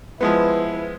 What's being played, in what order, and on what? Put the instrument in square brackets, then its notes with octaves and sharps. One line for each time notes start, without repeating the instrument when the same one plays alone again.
[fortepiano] F3 G#3 B3 [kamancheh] E4 B4